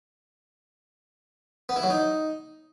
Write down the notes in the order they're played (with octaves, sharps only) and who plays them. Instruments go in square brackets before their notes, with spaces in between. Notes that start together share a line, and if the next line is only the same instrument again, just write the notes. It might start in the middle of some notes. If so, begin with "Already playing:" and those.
[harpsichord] B3
E4
F#3
D#4